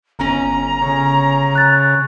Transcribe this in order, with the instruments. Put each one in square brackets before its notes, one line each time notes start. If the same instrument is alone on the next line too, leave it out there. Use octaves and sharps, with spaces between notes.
[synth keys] G1 C#4 [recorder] A#5
[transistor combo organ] C#3
[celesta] F#6 A6